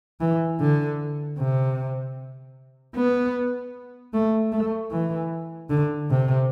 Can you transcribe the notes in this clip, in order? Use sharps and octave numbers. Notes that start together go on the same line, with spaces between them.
E3
D3
C3
B3
A3
A3
E3
D3
C3